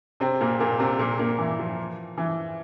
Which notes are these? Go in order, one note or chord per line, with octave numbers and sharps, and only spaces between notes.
C3 C4
A#2 A#3
A#2 A#3
C3 C4
A#2 A#3
A#2 A#3
E3
F3
E3